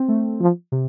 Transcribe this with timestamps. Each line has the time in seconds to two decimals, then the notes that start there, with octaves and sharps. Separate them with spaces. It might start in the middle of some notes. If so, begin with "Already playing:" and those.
Already playing: C4
0.08 A3
0.40 F3
0.72 C3